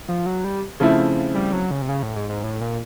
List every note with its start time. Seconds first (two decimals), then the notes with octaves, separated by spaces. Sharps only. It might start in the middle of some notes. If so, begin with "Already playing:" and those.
0.09 F3
0.26 F#3
0.44 G3
0.80 C#3 F3 A3 C4 E4
1.35 G3
1.53 F#3
1.71 C#3
1.82 C3
1.89 C#3
2.03 A2
2.16 G#2
2.29 G#2
2.44 A2
2.61 A#2